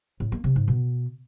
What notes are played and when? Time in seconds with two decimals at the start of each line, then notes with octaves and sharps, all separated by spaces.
0.20 A2
0.32 A#3
0.44 C3
0.56 G#2
0.68 B2